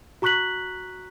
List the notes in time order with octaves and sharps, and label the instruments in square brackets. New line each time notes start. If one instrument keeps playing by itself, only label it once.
[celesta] F#4 A#5 C#6 F#6 B6 F#7